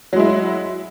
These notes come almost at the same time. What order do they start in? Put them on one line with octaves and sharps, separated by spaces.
F#3 G#3 E4